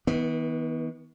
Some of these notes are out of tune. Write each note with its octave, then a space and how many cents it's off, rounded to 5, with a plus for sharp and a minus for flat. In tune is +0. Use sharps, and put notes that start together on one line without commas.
D#3 +45 B3 -15